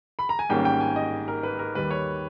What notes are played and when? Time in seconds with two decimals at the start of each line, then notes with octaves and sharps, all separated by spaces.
0.19 B5
0.29 A#5
0.39 G#5
0.49 G#1 G#2 G3 A#3 C#4 G5
0.65 G5
0.80 G#5
0.96 D#5
1.28 A#4
1.43 B4
1.59 A#4
1.75 D#2 D#3 G3 B4
1.91 C#5